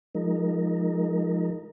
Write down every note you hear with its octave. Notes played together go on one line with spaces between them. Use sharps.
F3 G#3 D#4 A#4